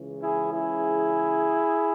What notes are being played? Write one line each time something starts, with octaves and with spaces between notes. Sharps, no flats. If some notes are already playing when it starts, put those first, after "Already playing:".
Already playing: C#2 C#3 E3
E4 G#4
E4 G#4